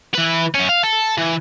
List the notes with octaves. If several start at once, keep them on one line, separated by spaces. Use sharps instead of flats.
E3 B4
F#2 C#4
F5
A4
E3